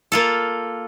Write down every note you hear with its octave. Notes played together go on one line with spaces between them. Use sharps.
A#3 F4 A4